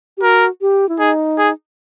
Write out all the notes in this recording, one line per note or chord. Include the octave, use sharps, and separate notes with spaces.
G4
F#4 A#4
G4
E4
D#4 G#4
G#4